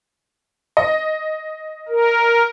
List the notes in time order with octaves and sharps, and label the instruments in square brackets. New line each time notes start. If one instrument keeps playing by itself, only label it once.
[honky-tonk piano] D#5
[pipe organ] A#4